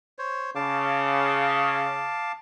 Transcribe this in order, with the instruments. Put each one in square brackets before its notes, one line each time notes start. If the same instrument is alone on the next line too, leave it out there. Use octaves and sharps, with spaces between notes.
[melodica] C5 C#5
[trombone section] C#3 [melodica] F5 A5 D6